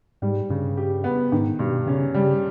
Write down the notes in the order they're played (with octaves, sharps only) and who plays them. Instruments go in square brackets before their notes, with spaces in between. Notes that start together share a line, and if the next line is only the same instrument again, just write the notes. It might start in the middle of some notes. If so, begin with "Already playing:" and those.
[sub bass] G#2 [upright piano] G3
[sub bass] G2 [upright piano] C#3
[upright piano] G4
B3
[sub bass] G#2 [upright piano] D#3
[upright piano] G2 [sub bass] B2
[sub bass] C#3 [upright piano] C#4
[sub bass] C#3 [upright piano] G3